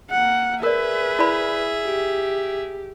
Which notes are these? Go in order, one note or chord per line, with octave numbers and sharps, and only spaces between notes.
A#3 F#5
G#4 A#4 B4 D5 E5
E4 D5 B5
G4